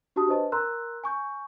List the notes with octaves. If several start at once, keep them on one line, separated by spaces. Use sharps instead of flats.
D4 F#4 G4 A5 D#6
D4 B4 C5 D#5 A5
A#4 A#5 C6 E6 F#6
G#5 C#6 G6